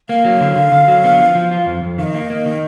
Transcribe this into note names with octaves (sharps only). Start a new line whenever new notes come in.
A#3 F5
F#3
D3
D3
D3
F#3
B3
F3
F3
F4
F2
F2
D#3 D#5 F5
A#3
A#3
D#3